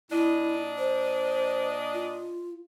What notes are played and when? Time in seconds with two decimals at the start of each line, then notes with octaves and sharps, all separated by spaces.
0.10 A#2 D4 E4 D#5
0.78 C5
1.94 F4